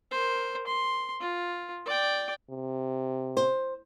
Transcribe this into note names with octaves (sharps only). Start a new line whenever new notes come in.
A#4 C5
C6
F4
D5 G5
C3
C5